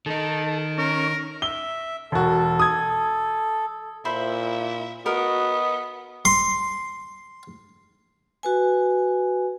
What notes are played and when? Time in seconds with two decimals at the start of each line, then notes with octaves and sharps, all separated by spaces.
0.06 D#3 D#4 A4
0.78 C#4 A#4
1.42 E5 G7
2.12 E1 F#4 A4
2.59 D#6 G#6
4.05 A#2 E4 C5 E5 B5
5.06 B3 F#4 A#4 D#5
6.25 C6
8.43 F#4 B4 G#5